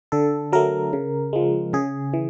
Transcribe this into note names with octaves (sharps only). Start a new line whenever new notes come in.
D3 A4
F#3 A3 A#4
C#3
F3 G#3
C#3 G#4
E3